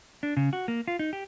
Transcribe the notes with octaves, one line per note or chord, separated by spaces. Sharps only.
D4
C#3
F#4
A#3
F4
D#4
G4